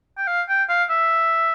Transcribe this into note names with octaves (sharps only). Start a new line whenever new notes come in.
G5
F5
G5
F5
E5